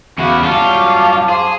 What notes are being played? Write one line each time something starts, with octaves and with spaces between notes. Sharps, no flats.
E2 C#3 E4 F#4 F5 D6
F#2 G3 C#4 F4 F#4 F5 A5 D6
G#4 C5